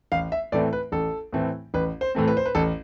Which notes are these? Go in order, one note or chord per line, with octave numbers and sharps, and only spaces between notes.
A1 F5
E5
A2 E3 A3 C4 D5
B4
A1 A4
A2 E3 A3 C4
A1 B4
C5
A2 E3 A3 C4
B4
C5
B4
A1 A4